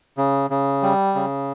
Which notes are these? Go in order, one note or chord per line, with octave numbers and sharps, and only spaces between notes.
C#3
C#3
G3
C#3